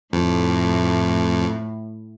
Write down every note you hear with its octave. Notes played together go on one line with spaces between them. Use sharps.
F2 A2